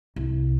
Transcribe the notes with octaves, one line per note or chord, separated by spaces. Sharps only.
C2